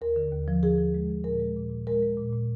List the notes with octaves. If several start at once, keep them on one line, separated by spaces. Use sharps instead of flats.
D#2 A#4
D3
D#2
F3
F3 G#4
F3
G#3
D#2
A#2 A#4
G#3
A#2
A#2
G#3 A#4
G#3
A#2
A#2